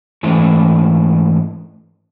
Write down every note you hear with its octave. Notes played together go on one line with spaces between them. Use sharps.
G#2 E3 A3